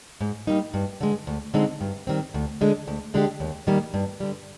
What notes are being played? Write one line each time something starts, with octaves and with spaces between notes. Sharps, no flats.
G#2
G3 A#3 D#4
G2
D3 G#3
D2
D3 G#3 C4 D#4
G2
D#3 G3 C4
D2
D3 G#3 D4
D2
D3 G#3 D4 G4
D#2
D#3 G3 A#3
G2
D3 G3